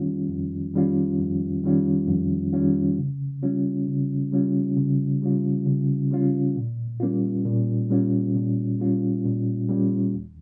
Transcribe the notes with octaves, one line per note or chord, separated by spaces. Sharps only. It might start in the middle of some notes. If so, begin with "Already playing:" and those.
Already playing: F2 D#3 G3 C#4 F4
F2
D#3 G3 C#4 F4
F2
D#3 G3 C#4 F4
F2
D#3 G3 C#4 F4
C#3
G3 C#4 F4
C#3
G3 C#4 F4
C#3
G3 C#4 F4
C#3
G3 C#4 F4
A#2
G3 A#3 C#4 F4
A#2
G3 A#3 C#4 F4
A#2
G3 A#3 C#4 F4
A#2
G3 A#3 C#4 F4
D#2